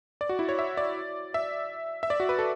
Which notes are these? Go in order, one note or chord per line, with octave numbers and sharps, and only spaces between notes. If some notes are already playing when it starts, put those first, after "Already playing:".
D5
F#4
E4
C#5
E5
D5
E5
E5
D5
F#4
B4
A4